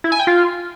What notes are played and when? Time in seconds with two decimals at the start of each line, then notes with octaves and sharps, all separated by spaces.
0.04 E4
0.12 G#5
0.20 G5
0.27 F4